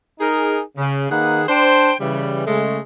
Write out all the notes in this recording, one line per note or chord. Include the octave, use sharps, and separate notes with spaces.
D#4 G#4 A#4
C#3
D#3 A#3 D#4 G#4 B4 F#5
D4 C5 G5
C#3 E3 G3
C#3 G#3 A3